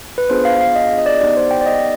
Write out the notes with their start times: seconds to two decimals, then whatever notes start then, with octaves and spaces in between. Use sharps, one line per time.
0.18 B4
0.30 B3 D4 F4 G#4 C5
0.45 F5
0.61 F5
0.76 D#5
0.98 D#5
1.06 D5
1.21 B3 D#4 G4 D5
1.37 C5
1.51 G5
1.61 D5
1.66 D#5